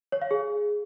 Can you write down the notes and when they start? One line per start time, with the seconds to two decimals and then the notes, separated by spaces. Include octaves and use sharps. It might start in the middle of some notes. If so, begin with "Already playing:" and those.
0.12 C#5
0.22 F5
0.31 G#4